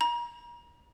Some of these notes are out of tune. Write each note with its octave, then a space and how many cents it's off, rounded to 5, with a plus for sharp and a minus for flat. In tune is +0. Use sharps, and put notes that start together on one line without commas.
A#5 +40